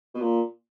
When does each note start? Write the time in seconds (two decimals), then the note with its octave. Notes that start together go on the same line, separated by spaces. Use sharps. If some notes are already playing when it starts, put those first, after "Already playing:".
0.15 B2
0.21 A#2